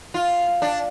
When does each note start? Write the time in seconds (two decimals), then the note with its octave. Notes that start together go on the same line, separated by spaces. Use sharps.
0.14 F4
0.62 D4